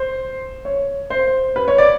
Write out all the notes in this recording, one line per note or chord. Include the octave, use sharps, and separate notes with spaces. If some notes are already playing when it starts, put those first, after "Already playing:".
Already playing: C5
C#5
C5
B4
C#5
D5